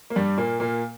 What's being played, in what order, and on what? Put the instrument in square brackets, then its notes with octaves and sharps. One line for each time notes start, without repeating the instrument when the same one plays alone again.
[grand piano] A#3
G2 G3
A#2 A#3
A#2 A#3